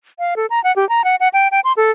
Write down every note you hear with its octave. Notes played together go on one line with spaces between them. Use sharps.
F5
A4
A#5
F#5
G4
A#5
F#5
F#5
G5
G5
C6
A4